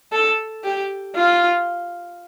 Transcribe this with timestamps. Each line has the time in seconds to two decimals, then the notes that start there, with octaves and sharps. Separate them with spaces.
0.12 A4
0.64 G4
1.15 F4